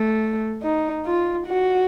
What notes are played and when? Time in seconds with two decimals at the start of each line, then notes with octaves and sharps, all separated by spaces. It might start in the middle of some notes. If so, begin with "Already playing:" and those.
Already playing: A3
0.63 D#4
1.06 F4
1.47 F#4